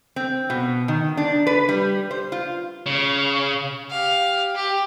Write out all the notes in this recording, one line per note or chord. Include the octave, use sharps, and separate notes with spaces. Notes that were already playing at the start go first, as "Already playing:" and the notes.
C4
B2
D#3
D4
B4
G3
C5
F4
C#3
G4 F5
G4